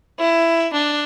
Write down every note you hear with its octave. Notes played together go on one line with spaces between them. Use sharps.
E4
D4